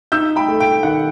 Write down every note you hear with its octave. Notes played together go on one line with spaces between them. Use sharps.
D#4 E6 G6
G5 B5
A3
G5
D#3 F#5